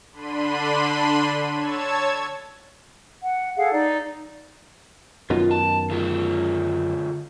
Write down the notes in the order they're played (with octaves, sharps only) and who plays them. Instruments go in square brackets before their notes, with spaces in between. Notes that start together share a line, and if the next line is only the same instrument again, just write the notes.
[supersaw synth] D3 D4 B5 C6 D#7
C#5 A5 E6 G#6
[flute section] F#5
G#4 A4 F5 F#5
D#4 D5
[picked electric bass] F#2 B2 D#3 [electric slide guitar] F4
[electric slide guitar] A5
D3 F4 G#4